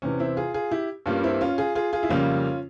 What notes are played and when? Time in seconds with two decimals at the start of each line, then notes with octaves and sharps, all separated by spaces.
0.02 E2 C3 E3 C#4
0.19 C4 E4
0.37 F4 G#4
0.54 F4 G#4
0.71 E4 G4
1.06 G2 G3 A#3 C#4 F4
1.24 C4 E4
1.41 C#4 F4
1.58 F4 G#4
1.75 F4 G#4
1.93 F4 G#4
2.03 E4
2.09 F2 C#3 G3 A#3 C#4 F4